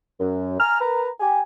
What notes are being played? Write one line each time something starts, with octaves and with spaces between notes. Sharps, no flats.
F#2
G#5 A#5 F6
A#4 B4 A#5
G4 G#5